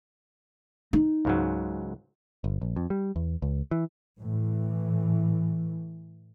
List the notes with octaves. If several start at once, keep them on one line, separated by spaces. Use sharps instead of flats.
D#4
C#2 G#2 F#3
G1
A#1
F2
G3
E2
C#2
E3
A2 E3